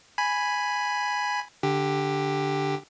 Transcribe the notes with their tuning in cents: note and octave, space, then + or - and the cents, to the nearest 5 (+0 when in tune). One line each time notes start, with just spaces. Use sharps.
G#5 +0 B5 +0
D3 +0 G4 +5